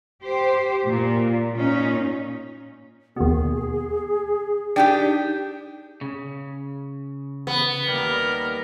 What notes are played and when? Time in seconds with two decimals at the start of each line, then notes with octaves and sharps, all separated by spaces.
0.22 G4 C5
0.86 A#2
1.53 A#2 C#4 D#4
3.16 D#2 B2 G#4
4.76 D4 D#4 G4 G5
6.01 C#3
7.47 B3
7.89 D#2 G3 A#4